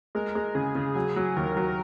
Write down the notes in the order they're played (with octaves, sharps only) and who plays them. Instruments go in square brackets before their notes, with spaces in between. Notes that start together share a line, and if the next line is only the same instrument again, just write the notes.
[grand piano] G#3 [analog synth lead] A#4
[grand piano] G#3
[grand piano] C#3 [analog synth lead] G#4
[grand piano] C#3
F#3
F#3
[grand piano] D#2 [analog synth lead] A#4
[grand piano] F#3